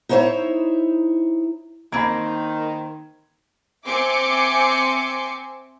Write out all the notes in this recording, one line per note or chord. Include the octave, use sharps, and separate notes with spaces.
D#4 E4 C5 C#5 E5
D#3 A#3 C4 B5 G#6
C4 E5 G#5 C6 D6 C#7